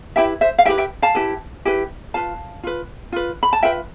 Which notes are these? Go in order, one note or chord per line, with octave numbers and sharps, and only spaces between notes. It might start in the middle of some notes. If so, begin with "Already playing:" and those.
E4 G4 B4 E5 G5
C5 E5
F5
E4 G4 B4 E5 G5
E5 G5
F5 A5
E4 G4 B4
E4 G4 B4
F4 B4 F5 A5
F4 B4
F4 B4
B5
A5
F4 B4 E5 G5